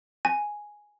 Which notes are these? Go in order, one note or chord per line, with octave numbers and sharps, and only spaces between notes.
G#5